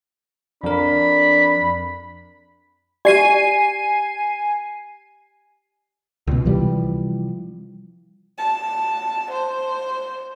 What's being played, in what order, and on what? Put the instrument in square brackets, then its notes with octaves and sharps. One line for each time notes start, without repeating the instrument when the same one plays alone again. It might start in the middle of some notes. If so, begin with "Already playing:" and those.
[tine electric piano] F2 A#4 [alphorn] D4 [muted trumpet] B5
[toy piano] G4 D5 [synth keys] G#5 C7 D#7
[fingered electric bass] C#2 B2
C3 E3 F3 G3
[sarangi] A5
C5